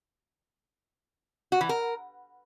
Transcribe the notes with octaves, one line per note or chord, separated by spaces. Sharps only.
F#4
E3
A#4